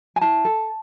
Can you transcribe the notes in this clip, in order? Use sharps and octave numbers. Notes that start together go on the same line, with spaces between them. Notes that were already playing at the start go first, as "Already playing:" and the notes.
G#5
E4 A5
A4